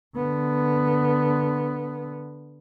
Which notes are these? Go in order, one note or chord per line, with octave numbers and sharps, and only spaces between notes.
D3 B3